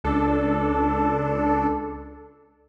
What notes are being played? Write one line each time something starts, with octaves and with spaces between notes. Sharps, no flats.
C#2 D4 A4